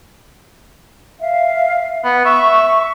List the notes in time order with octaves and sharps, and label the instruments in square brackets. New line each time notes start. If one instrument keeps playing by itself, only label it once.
[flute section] E5 F5
[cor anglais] B3
[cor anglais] E5 [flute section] C#6